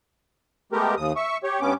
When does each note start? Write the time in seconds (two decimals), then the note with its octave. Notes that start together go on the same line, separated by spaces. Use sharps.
0.72 G#3 A3 B3 G4 A#4
0.97 D#2 D#6
1.16 E5 C#6
1.44 G4 C#5
1.61 G2 B3 C#4 D6